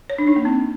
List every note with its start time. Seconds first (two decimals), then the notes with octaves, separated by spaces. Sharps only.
0.10 C#5
0.18 D4
0.27 D#4
0.36 A#3
0.45 C4